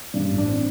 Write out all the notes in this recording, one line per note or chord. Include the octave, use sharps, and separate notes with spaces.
G2 D4
A1
D4
C4